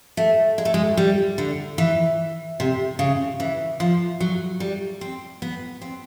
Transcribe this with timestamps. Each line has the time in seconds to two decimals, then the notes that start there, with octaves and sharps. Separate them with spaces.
0.17 A3
0.58 G#3
0.65 A3
0.74 G#3
0.97 G3
1.38 D3
1.78 E3
2.60 C3
2.99 C#3
3.40 E3
3.80 F3
4.20 F#3
4.60 G3
5.01 C4
5.42 B3
5.82 C4